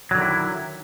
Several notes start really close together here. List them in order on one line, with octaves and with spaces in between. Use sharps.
F#3 D3 D#3 E4